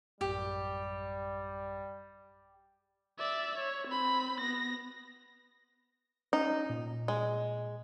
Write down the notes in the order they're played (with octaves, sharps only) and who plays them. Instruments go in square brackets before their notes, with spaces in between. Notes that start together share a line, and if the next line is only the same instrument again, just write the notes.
[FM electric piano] A1 F#2 [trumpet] G3 [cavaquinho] G4
[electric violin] D5 E5
C#5
C4 B5
B3 A#6
[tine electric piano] C#4 [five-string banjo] D#4
[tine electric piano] A#2
[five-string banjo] G#3